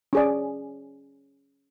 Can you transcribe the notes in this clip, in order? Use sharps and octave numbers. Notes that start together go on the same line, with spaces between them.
C#4 G#4 D5